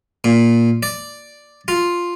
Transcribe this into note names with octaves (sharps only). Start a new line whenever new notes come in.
A#2
D5
F4